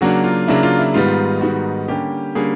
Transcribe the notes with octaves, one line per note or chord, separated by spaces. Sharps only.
C#3 F#3 A#3 D4 F#4
F4
C#3 F#3 A#3 D4 E4
F4
E4
G#2 D#3 G3 B3 F4
G#2 D#3 G3 B3 F#4
D3 G3 A#3 C#4 G4
D3 G3 A#3 C#4 G#4